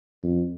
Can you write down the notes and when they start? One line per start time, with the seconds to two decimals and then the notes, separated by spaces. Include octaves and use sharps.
0.23 F2